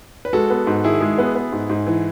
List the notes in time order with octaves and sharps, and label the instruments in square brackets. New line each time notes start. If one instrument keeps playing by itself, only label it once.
[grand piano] B4
[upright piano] G#3 [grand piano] F#4 A4
[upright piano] B3
G#2
[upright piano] D#3 [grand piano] E4 G#4
[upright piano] G#3
B3
B3
G#2
G#2
E3